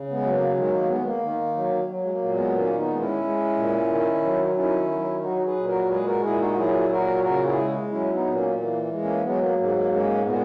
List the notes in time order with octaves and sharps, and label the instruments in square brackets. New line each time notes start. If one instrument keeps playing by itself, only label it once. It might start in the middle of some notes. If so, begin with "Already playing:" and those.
Already playing: [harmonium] C#3
G#3 B3
F#3
A#3
D#3 G#3
A#3
G#3 B3
G#3
A#3
D#3
F#3
F#3
G#3
A#3
A#2
G#3 B3
D#3 A#3 C#4
B3 D#4
G#3
C#4 E4
G#3
A#2
D#3
F#3
D#3 C#4 E4
F#3
F#3 D#4 F#4
G#4 B4
A#2
F#4 A#4
G#3 G#4 B4
F#4 A#4
A#2 E4 G#4
D#4 F#4
F#4
F#3 E4 G#4
A#2 F#4 A#4
C#3 F#4 A#4
E4 G#4
G#3
F#3 C#4 E4
B3 D#4
A#2
A#3 C#4
E3 A#3
G#3
A#3 C#4
F#3 G#3 B3
A#3
G#2 A#3
A#3
G#3 A#3 C#4
A#2 G#3 B3